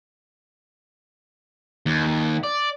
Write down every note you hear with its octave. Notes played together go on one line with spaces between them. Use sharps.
D#2
D5